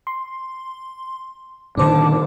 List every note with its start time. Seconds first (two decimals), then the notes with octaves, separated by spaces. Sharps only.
0.07 C6
1.77 A#2 D3 D#3 D4 C5 A5 D6